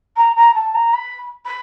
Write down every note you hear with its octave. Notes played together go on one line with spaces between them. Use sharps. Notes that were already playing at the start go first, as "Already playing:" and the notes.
A#5
A#5
A5
A#5
B5
B5